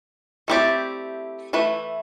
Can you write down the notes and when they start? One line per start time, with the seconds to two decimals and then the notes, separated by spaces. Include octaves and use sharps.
0.48 A3 C4 E4 G4 D5
1.53 E3 A3 E4 B4